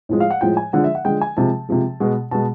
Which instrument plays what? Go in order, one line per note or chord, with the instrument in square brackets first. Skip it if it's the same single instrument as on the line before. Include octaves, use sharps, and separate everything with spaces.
[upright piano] A2 F3 G#3
F5
F#5
A2 F3 G#3 G5
G#5
D3 F3 G#3 F#5
E5
F#5
D3 F3 G#3 G5
G#5
C3 F3 G#3 A5
C3 F3 G#3
B2 G#3
B2 G#3 A5